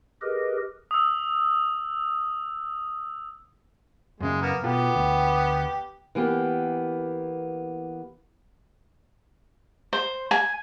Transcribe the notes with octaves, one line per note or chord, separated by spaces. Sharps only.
G4 G#4 A#4 B4 D#5
D#6 E6
F#2 C#3 G#3
A#3 B3
B2 B3 F4 G4 A4
D2
E3 A#3 B3 G4
C5
G#5